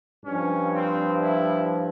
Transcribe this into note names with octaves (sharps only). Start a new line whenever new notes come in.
G2 F3 C#4
C4
E4